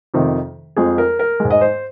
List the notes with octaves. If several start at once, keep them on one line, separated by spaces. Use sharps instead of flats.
F2 C3 D#3
F2 F3 G#3 G#4
A#4
A#4
G#2 G#3
D#5
C5